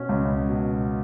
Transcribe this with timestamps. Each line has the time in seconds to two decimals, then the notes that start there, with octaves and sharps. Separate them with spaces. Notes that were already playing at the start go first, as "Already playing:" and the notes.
Already playing: B2 C#4
0.09 C#2
0.49 B2